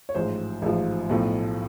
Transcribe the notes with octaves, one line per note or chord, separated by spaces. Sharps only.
C#5
A1 G#2 F3 C5
A1 G#2 F3
B1 A2 F3